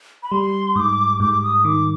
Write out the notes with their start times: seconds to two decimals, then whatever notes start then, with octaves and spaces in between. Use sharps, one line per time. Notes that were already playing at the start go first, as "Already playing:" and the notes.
0.23 B5
0.32 G3 C6
0.75 G#2 D#6
0.80 D6
1.20 G#2 D6
1.43 D#6
1.65 D#3 D6